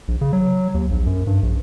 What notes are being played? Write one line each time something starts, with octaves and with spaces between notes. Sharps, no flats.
A#1
C#3
F#3
D#2
A#1
F#2
G2
A#1